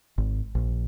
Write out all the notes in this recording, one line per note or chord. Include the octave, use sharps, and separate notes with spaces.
G#1
A#1